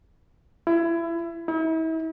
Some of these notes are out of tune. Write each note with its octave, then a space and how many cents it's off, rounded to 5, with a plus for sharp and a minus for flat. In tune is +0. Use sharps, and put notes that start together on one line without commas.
E4 +25
E4 -40